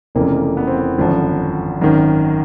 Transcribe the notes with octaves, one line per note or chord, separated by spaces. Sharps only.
F1 F2 C#3 E3 A#3
B3
C4
B3
G#1 F#2 D3 F3
G#1 F#2 D#3